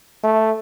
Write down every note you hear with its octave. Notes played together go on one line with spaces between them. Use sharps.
A3